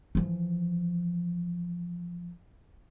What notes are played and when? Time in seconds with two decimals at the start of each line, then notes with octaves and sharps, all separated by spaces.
0.15 E3 F3